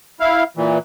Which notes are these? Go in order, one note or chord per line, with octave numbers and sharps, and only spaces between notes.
E4 F5
A#2 E3